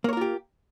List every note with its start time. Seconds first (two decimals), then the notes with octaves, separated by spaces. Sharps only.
0.04 A#3
0.09 C#5
0.13 A#4
0.17 F4
0.21 G4